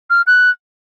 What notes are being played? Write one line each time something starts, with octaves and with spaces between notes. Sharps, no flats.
F6
F#6